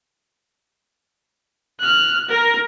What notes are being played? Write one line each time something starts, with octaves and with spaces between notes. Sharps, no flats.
F6 F#6
A#4